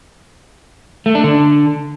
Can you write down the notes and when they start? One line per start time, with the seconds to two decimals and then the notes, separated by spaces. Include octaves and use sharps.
1.06 A3
1.15 D4
1.24 D3